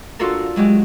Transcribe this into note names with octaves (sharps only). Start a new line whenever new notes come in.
D4 F4 F#4 A4 A#4
F#3 G#3 G4